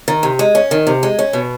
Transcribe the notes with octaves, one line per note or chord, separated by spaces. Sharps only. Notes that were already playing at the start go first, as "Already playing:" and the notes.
D#3
C3
G#3
C#4
D#3
C3
G#3
C#4
B2